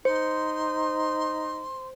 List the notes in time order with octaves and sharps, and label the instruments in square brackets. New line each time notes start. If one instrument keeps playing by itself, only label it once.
[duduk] D#4 [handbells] C5 [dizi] C6